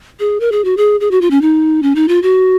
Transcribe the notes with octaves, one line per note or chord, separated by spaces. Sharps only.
G#4
A#4
G#4
F#4
G#4
G#4
F#4
F4
C#4
D#4
C#4
D#4
F4
F#4